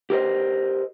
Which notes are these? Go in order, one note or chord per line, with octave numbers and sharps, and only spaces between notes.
G4 A#4 C5 D#5